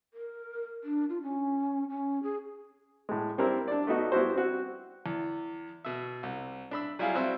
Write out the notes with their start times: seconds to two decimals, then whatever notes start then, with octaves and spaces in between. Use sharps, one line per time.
0.14 A#4
0.84 D4
1.09 F4
1.23 C#4
1.90 C#4
2.23 G#4
3.09 A2 G#3
3.38 G3 C4 E4 A#4 C5
3.68 D4 D5
3.87 A3 B3 D#4 F#4
4.12 G3 B3 E4 F#4 C5
4.35 C4 F#4
5.06 E2
5.85 B2 E5
6.23 C2
6.71 D4 B5 E6
6.99 F#3 G3 E4 F4 G#4 F5
7.14 G3 C4 E4 F#4 C5 E5